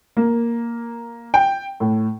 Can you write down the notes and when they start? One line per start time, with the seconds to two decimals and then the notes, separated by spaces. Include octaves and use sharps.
0.17 A#3
1.34 G5
1.80 A2